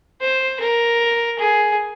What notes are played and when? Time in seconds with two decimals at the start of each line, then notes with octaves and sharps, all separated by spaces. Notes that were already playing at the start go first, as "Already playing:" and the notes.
0.21 C5
0.60 A#4
1.39 G#4